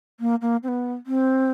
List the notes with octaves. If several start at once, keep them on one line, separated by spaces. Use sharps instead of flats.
A#3
A#3
C4
B3
C4